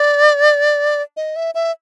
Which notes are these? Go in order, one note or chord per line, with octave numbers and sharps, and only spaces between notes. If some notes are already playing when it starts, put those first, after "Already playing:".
Already playing: D5
D#5
E5
E5